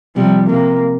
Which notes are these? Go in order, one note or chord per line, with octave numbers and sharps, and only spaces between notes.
C3 F3 G3
C3 A#3